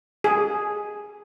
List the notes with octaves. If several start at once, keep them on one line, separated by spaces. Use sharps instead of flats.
G#4